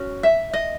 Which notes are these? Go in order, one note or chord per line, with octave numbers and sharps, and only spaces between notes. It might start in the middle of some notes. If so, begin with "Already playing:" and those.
Already playing: C#4 F#4
E5
D#5